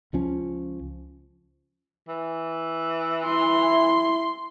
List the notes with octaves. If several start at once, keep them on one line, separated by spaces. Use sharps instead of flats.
C#2 F3 C#4
E3
E4 C6